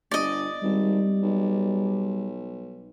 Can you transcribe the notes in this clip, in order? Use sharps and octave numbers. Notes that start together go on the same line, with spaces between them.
G1 D5 D#5
G#1 G3
B1